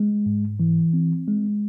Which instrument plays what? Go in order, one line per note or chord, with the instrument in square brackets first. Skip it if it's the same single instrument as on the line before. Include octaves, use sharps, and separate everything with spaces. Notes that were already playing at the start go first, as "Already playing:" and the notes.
Already playing: [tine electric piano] G#3
G#2
E3
C4
G#3